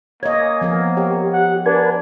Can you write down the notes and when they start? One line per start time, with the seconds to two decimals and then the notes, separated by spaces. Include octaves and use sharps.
0.23 A#3 C#5 D#5 G#5
0.61 F3 B3 A#4
0.97 G4 C#5
1.33 F#5
1.66 D4 A#4 B4 G#5